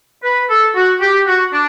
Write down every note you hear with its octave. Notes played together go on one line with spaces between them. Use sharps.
B4
A4
F#4
G4
F#4
D4